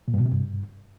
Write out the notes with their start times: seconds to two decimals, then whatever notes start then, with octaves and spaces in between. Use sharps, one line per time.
0.08 A#2
0.14 G2
0.20 B2
0.26 C3
0.32 G2